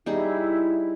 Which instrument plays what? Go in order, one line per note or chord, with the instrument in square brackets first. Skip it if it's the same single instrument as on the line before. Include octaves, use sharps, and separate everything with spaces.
[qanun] G3 D#4 G#4 [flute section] E4